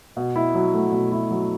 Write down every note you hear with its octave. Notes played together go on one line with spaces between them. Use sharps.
B2
E4
F#3
A3
B2
E4
F#3